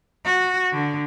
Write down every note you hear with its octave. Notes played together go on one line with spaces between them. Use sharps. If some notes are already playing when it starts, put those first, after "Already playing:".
F#4
D3